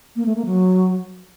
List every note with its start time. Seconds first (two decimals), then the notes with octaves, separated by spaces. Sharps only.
0.16 A#3
0.26 A3
0.36 A#3
0.46 F#3